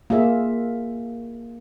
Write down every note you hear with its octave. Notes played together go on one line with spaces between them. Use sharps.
A#3 F4 G#4 E5